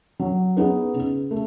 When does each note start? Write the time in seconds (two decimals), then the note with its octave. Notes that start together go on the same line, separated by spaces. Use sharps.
0.20 F#3
0.57 B3 D#4 G#4
0.94 C#3
1.31 A3